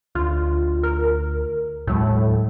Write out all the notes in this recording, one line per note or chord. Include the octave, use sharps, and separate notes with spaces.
D2 F4
A#4
D#2 A2 F#3 G#3